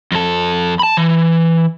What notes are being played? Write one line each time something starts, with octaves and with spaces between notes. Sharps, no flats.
F2 A4
A5 B5
E3